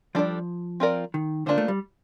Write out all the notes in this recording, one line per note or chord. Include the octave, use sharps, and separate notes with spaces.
F3 G3 D4 A4 D5
C4 F4 A#4 D5
D#3
D3 A#3 D4 F4 C5
A3
G3